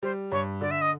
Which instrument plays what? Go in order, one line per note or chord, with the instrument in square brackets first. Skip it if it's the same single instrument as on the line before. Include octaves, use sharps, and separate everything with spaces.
[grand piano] G3 [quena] C5
[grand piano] G2 [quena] C#5
[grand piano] D3 [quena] D5
[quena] E5
D#5